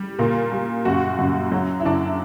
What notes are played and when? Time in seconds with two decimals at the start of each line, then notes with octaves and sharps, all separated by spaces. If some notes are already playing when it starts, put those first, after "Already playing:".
Already playing: G3
0.19 A#2 A#4
0.52 G3
0.85 F#2 F#4
1.19 F#2
1.52 F#3
1.80 E4
1.86 F#2 D4